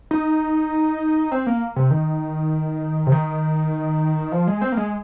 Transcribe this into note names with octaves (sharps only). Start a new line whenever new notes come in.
D#4
C4
A#3
C3
D#3
C3
D#3
F3
G#3
C4
A#3
G#3